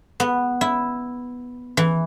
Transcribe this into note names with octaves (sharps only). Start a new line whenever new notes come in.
B3
E4
E3